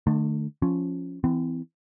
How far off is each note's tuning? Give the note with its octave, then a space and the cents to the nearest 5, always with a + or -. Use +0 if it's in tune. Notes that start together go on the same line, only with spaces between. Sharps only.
D3 +35 A3 +0
F3 +0 C#4 +0
E3 +0 C4 -35